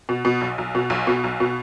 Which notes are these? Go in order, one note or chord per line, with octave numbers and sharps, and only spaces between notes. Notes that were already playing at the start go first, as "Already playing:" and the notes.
B2
B2
B1
B1
B2
B1
B2
B1
B2